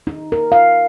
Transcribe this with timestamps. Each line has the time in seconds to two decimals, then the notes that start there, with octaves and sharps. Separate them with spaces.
0.07 D#4
0.32 A#4
0.52 F5